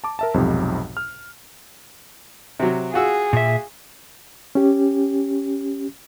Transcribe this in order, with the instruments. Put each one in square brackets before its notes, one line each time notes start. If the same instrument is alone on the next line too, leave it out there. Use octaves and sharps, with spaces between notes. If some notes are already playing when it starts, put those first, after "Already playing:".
[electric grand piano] A5 D6
A#4 E5 A5
B1 F2 G#2 C3
F6
[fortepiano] C3 F#3
[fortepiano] F4 F#4 E6 [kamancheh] G#4
[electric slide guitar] A#2 E5
[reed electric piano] C#4 G4